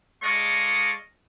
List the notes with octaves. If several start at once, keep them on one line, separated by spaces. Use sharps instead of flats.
G#3 A4 D5 D#5 F5 C#6